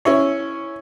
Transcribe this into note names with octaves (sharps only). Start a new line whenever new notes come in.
C#4 E4 C#5